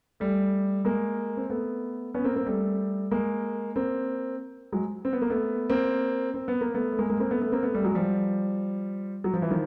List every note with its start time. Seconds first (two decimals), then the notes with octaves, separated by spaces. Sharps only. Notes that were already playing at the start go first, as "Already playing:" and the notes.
0.20 G3 A3
0.85 G#3 A#3
1.37 C4
1.50 A3 B3
2.14 B3 C#4
2.24 A#3 C4
2.35 A#3 C4
2.46 G3 A3
3.11 G#3 A#3
3.76 A#3 C4
4.72 F#3 G#3
5.05 C4
5.13 B3
5.22 A#3
5.30 A3 B3
5.70 A#3 C4
6.34 C4
6.48 B3
6.61 A#3
6.74 A3 B3
6.92 A3
6.99 G#3 A#3
7.10 G#3 A#3
7.20 A#3 C4
7.31 A3 B3
7.41 A3 B3
7.52 A#3 C4
7.63 A3 B3
7.74 G3 A3
7.85 F#3 G#3
7.95 F3 G3
9.24 F#3
9.34 F3
9.42 E3
9.50 D#3 F3